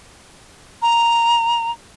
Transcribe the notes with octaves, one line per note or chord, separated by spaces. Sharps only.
A#5